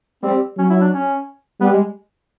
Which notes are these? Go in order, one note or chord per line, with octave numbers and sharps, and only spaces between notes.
G3 C4
F#3 C#4
E4
D4
C#4
G3 B3
G#3